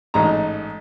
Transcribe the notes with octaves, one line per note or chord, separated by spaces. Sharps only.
A1 G#2 A#5